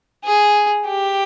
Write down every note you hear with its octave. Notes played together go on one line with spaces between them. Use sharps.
G#4
G4